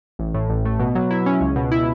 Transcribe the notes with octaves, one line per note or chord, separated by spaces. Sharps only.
A1
A2
A1
A3
B2
F#3
E4
C#4
C#2
B2
E4